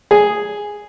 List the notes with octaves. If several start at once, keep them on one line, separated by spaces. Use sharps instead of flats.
G#4